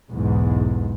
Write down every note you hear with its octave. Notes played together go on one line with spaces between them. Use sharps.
B1 E2 G#2